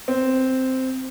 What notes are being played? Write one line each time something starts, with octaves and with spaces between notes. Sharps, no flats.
C4